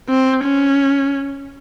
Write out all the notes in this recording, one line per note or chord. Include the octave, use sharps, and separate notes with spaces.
C4
C#4